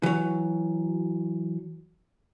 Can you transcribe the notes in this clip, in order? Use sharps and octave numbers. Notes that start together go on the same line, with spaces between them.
E3 F#3